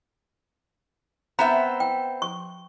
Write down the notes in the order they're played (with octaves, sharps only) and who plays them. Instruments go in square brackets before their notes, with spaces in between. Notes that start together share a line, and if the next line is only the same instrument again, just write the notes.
[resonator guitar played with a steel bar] B3 C4 E5 [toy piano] A#5
[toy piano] G5
C#6